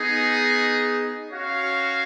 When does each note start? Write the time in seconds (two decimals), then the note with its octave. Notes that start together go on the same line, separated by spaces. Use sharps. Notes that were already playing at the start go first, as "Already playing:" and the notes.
Already playing: B3 D#4 G#4 D#5
1.30 C#4 F#4 C#5 F5